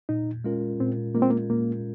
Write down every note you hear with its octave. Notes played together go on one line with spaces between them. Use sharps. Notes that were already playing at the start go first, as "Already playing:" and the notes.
A#2 D#4
G#3 C#4 F4 A#4
A#2 C4
G#3 A#3 C#4 F4 A#4
C4
A#3
A#2 A#3